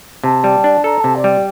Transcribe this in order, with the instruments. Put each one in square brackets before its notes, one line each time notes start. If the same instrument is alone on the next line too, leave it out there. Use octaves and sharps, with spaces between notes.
[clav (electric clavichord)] C3 [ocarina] A5
[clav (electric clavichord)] G3
D4
[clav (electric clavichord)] A4 [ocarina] A#5
[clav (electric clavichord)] C3 [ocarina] A5
[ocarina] D5
[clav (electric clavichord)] G3
[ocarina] D5